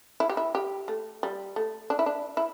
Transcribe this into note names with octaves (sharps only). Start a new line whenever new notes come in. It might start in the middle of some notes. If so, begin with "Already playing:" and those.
E4
G4
E4
G4
A3
G3
A3
D4
E4
D4
E4